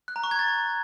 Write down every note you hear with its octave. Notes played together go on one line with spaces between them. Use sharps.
F#6
A#5
C#6
G#6
A6